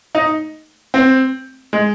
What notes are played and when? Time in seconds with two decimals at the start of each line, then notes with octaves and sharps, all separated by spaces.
0.15 D#4
0.94 C4
1.73 G#3